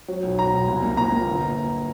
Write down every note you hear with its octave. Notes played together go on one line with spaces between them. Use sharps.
F#3
B1
B1 A#5
B1
C2
A#3
A#2 A#5
A#3
G1